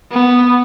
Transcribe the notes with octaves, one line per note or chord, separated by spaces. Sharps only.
B3